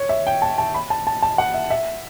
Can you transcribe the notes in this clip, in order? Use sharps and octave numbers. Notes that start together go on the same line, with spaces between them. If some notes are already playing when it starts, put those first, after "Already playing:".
Already playing: C#5
E5
G5
A5
A5
B5
A5
A5
A5
F#5
E5
E5